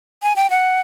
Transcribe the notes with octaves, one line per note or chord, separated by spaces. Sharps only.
G#5
G5
F#5